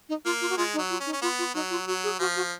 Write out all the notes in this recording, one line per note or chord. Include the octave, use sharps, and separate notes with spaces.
D#4
A#3 F4
F4
F#4
G#3 F4
D#4
F#3
F4
C#4
D#4
C#4
B3 F4
F4
F#3 D#4
F4
F#3 F#4
G#4
F3 F#4
F#4